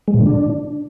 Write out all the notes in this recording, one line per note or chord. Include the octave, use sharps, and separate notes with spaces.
G#3
A#2
D3
D4